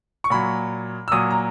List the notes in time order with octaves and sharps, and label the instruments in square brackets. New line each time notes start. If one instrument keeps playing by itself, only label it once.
[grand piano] C#6
A#2 F#3 B5
E6
A#2 F#3 D#6
A#5